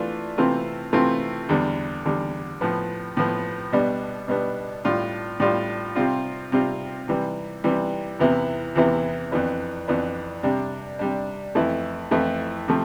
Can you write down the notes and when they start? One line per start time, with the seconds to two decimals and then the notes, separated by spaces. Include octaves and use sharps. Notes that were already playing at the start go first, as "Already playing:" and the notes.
Already playing: E3 A3 D4 F4
0.38 C3 E3 A3 C4 F4
0.93 C3 E3 A3 C4 F4
1.49 E2 D3 G3
2.05 E2 D3 G3
2.61 A2 F3 B3
3.17 A2 F3 B3
3.72 B2 G3 B3 D4
4.28 B2 G3 B3 D4
4.84 A2 G3 D4 F4
5.40 A2 G3 D4 F4
5.96 C3 G3 C4 F4
6.52 C3 G3 C4 F4
7.08 C3 E3 G3
7.64 C3 E3 G3
8.19 E2 C3 E3 B3 E4
8.76 E2 C3 E3 B3 E4
9.31 F2 E3 B3 D4
9.88 F2 E3 B3 D4
10.43 C3 G3 D4
10.99 C3 G3 D4
11.55 F2 E3 A3 E4
12.11 F2 E3 A3 E4
12.68 C3 F3 A3